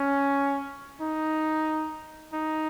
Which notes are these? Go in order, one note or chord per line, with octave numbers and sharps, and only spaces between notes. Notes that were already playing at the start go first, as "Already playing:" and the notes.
Already playing: C#4
D#4
D#4